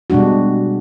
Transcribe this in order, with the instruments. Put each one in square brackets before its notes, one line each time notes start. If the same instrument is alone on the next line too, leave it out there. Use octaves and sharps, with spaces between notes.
[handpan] B2 G3 G#3 D4 F#4